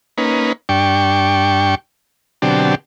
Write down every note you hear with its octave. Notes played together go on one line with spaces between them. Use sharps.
A#3 C#4 D#4 B4
G2 D4 G5 C#6
B2 D3 F#3 C4 D4 G4